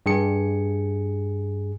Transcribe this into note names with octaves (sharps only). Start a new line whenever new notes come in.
G2 G#4 C#7